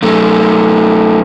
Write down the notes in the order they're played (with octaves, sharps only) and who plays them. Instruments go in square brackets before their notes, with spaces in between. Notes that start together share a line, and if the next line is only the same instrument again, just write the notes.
[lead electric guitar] F#2 A3